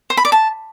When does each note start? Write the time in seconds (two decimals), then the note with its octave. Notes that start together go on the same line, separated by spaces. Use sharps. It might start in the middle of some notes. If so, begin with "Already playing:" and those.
0.10 C5
0.17 B5
0.25 D5
0.32 A5